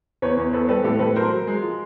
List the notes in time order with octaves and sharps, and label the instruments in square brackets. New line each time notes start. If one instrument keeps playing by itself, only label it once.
[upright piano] E2 B4 C#5
E2
E2 A4 B4
G3 A4 B4
A2 G4 A4
A2 A4 B4
F#3 A#4 C5
F#3
G#3
F3